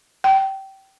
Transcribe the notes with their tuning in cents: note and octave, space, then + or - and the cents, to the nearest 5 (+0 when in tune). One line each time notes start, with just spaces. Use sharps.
G5 -20